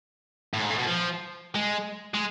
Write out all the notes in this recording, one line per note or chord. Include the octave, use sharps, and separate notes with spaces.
A2
G#2
A2
B2
F3
G#3
G#3